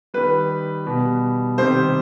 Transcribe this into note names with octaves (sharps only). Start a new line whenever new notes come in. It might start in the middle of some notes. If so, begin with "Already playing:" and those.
D#3 G3 B4
B2 G3
C3 D#3 G3 C5